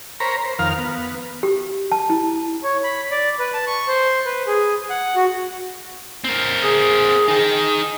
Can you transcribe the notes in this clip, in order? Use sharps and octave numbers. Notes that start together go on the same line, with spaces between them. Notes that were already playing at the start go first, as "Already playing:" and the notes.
A#4 C5 C#5 A#5 B5
C5
F2 D#3 A#4 F5 F6
B3
G4
A5
E4
C#5
B5
D5
B4
A5
C#6
C5
B4
G#4
F#5
F#4
C4 A#4
G#4
D#4 G#4 G5